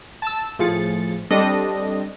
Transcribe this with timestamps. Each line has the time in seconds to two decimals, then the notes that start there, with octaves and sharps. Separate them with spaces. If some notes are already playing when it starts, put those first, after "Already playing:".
0.22 A5 E6
0.59 A2 F3 G#4 A6 C#7
1.31 G3 C4 D4 A4 D#5